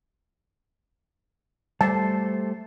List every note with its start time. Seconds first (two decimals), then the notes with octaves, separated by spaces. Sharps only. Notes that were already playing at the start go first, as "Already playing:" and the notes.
1.81 G3 A3 C5 A5